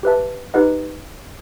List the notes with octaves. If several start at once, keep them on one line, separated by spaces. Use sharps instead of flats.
G4 B4 E5 A5
D#4 G4 B4 D#5 F#5